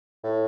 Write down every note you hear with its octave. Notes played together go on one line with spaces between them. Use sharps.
A2